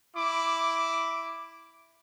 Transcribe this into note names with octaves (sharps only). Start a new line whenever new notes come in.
E4 D6